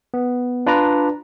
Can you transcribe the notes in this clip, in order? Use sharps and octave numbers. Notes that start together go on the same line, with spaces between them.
B3
D4 F4 B4 D5 A#5